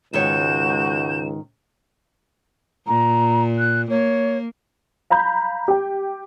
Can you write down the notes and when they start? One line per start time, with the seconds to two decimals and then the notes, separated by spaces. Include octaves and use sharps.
0.13 C#2 G#2 D#3 F#4 C#5 G6 E7
2.87 A#2 A#5
3.59 F#6
3.90 A#3 C#5
5.10 F5 A#5 B5 G6
5.68 G4 G5